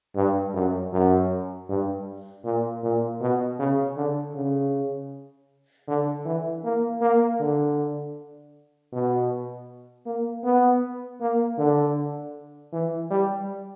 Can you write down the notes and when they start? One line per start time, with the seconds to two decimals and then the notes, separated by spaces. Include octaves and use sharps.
0.16 G2
0.54 F#2
0.93 F#2
1.69 G2
2.44 A#2
2.83 A#2
3.21 B2
3.59 C#3
3.97 D3
4.35 C#3
5.88 D3
6.25 E3
6.64 A#3
7.01 A#3
7.40 D3
8.93 B2
10.06 A#3
10.44 B3
11.21 A#3
11.58 D3
12.73 E3
13.11 G3